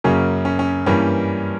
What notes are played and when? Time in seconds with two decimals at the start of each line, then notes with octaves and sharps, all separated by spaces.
0.04 F#2 C#3 F#3 A#3 C#4
0.45 C#4
0.59 C#4
0.86 G2 E3 G3 A#3 C#4